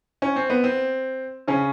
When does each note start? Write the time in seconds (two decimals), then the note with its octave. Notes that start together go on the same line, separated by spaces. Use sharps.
0.22 C#4
0.36 C4
0.50 B3
0.64 C4
1.48 C#3 C#4